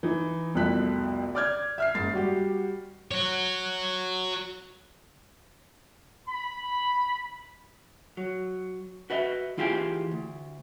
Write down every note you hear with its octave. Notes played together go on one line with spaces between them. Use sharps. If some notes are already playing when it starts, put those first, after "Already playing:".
E3 D#4
C2 F2 B2 A3 F#6 B6
D5 D6 F6 G6 G#6
E5 F6 C7
F#1 G#2 A6 C7
G3 F#4 G4
F#4 C#5
B5
F#3
F#4 B4 D#5 E5
E3 E4 F4 G4 G#4 G5
D2